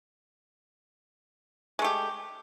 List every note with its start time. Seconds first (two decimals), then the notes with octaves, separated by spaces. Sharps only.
1.79 G#3
1.82 A3
1.84 G4